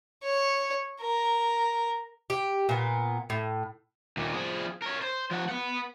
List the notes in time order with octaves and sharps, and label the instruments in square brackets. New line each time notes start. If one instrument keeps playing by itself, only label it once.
[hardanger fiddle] C#5
A#4
[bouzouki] G4
A#2 B3
A2
[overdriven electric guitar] D#2 A#2
F3 G#4
A#4 C#5
C5
F3 F#5
B4 F#5